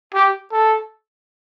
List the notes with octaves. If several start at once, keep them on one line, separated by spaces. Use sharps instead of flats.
G4
A4